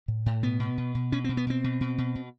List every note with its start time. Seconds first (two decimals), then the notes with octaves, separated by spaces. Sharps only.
0.08 A2
0.26 A2
0.43 B2 B3
0.60 B2
0.78 B2
0.95 B2
1.12 B2 C#4
1.24 B2 C4
1.37 B3
1.47 B2 C4
1.64 B2
1.81 B2
1.98 B2
2.15 B2